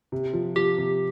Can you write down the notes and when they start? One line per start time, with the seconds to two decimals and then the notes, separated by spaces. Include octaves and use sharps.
0.12 C3
0.33 F3
0.56 F3 G4
0.78 C3